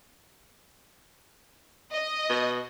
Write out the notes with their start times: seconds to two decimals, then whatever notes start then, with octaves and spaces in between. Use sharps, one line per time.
1.92 D#5
2.30 B2